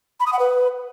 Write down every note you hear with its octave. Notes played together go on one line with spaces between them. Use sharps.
B5
D#6
F#5
B4